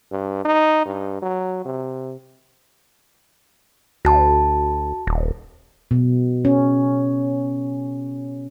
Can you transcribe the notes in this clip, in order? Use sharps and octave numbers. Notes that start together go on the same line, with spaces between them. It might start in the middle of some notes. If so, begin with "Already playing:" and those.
G2
D#4
G2
F#3
C3
D2 F#4 A5
D#1
B2
C#4